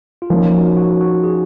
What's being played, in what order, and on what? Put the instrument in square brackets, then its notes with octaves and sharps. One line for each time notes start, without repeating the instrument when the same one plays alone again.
[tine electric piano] F4
[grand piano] F3 A#3 C#4 [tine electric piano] D#4
[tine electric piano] F#4
F#4
F#4
G#4